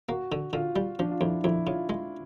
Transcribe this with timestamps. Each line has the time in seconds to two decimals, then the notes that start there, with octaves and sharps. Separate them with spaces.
0.09 A#3 F#4
0.32 D3
0.53 D3 F4
0.76 G3
0.99 F3 D4
1.11 F4
1.21 F2 E4
1.44 F2 E4
1.67 C#3 F4
1.89 G#3